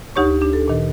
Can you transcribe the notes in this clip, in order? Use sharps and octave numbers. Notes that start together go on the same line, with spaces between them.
D2 D#4 G4 C#5 C#6
D4 G4
A4
A#2 D#3